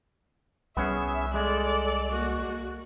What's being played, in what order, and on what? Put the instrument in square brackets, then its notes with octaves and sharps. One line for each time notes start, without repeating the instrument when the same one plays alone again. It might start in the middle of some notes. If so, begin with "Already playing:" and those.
[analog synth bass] C2 [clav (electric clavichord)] B3 C#4 G#4 [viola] E5
[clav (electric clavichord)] G#3 [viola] A4 D5
[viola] A#3 F#4